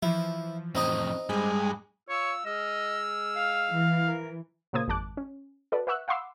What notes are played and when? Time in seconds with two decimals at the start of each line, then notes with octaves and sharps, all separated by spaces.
0.03 E3 F3 E4
0.75 F2 A2 C4 D#4 D#5
1.29 G2 G#3 B5
2.09 F4 C#5 E6
2.46 G#3 D#5 E6 F6
3.36 F5
3.69 E3
4.07 A#4
4.73 A#2 C#3 A#3 C5 D#6 G#6
4.88 G#1 F2 G#3 A5 D6 F#6
5.17 C#4
5.72 F#4 A4 B4 D5
5.87 B4 E5 F#5 C#6 E6 F#6
6.08 F5 F#5 B5 C6 D6 E6